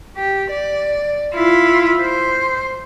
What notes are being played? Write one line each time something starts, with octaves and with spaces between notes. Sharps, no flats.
G4
D5
E4 F4
C5